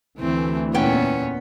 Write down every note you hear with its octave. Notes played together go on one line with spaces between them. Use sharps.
D2 E3 A3 C4
E2 A#2 B3 C#4 G5